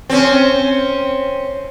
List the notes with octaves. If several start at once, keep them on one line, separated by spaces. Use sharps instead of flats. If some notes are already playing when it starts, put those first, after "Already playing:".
C4 C#4